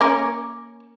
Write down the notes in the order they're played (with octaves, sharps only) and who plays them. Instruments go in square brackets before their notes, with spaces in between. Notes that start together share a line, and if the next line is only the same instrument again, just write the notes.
[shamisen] A#3 C#4 A#4